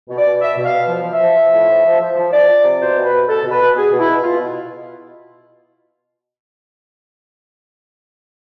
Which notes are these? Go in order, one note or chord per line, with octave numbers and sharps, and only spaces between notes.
B2
D5
B2
B2 E5
B2
F5
B2
F3
F3
E5
F3
F3
A2
F3
F3
F3
F3
F3 D5
F3
C3
B2 C5
B2
B4
B2
B2 A4
B2
B4
B2
B2 G#4
B2
E4
B2
B2 F4
B2